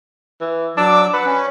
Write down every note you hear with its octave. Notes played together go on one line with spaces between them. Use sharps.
E3
F#3 D4 D6 E6
B4 F#5
C#4